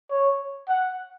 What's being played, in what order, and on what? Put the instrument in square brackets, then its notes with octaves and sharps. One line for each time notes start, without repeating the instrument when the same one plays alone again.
[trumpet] C#5
F#5